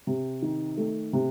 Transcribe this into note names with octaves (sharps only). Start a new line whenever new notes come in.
C3
D#3
A3
C3